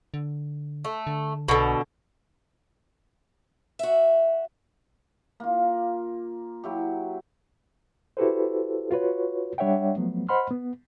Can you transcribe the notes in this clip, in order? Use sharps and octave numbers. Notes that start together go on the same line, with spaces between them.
D3
A3
D3
B1 B2 D3
F#4 E5
A#3 F4
F#3 E4 G4
E4 F#4 G4 A4 B4 C5
F4 F#4 B4 C#5
G3 D4 C#5 E5 F#5 G5
F3 F#3 A3 B3
C5 D#5 F#5 B5 C6 F6
B3